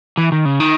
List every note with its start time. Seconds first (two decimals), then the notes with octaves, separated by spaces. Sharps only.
0.17 E3
0.32 D#3
0.45 C#3
0.60 D#3